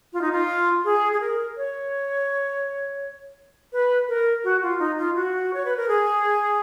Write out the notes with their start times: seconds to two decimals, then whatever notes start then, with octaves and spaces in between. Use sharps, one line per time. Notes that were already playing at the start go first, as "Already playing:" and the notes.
0.13 F4
0.21 D#4
0.32 F4
0.85 G#4
1.13 G#4
1.21 A#4
1.57 C#5
3.73 B4
4.09 A#4
4.44 F#4
4.63 F4
4.79 D#4
4.98 F4
5.16 F#4
5.54 C#5
5.65 B4
5.77 A#4
5.88 G#4